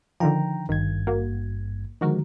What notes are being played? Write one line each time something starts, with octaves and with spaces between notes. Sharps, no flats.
D3 D#3 F3 G5 A#5
G#1 G2 D#3 G#6
A#3 F#4
D3 D#3 F3 G#3 F#4 A#4